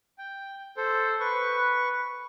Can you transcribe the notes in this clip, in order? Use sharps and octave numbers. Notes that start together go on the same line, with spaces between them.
G5
A4 C5
B4 C#6